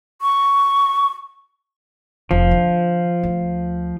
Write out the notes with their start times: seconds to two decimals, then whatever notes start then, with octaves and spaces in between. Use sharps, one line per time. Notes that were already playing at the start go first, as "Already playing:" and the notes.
0.22 C#6
2.31 F1 F3
2.51 D3
3.23 D2